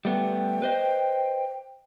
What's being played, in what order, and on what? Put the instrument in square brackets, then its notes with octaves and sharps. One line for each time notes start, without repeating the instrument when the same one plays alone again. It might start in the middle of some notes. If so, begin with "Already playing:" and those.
[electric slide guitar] G3 A3 B3 [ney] G5
[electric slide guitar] B4 C5 D#5